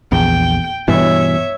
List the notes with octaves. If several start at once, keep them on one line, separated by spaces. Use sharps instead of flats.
A#1 E2 G5
G2 B2 E3 C#5 E5